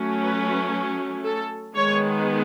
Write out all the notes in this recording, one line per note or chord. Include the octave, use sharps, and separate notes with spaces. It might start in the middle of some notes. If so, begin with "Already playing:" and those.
Already playing: F#3 A3 C#4
B4
A4
D#3 G#3 B3 C#5